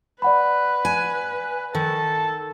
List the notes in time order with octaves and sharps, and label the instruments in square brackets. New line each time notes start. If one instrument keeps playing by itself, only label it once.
[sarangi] B4 [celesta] D5 F#5 B5
[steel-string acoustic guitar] G#5
[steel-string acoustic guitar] D#3 [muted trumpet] A4 [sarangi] A5